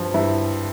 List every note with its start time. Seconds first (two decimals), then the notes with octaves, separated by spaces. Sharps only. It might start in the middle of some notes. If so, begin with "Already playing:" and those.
Already playing: G2 F3
0.14 G2 E4